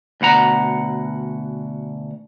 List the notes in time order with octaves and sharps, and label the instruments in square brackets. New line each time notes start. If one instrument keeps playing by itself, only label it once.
[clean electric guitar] D2 B2 F#5 A#5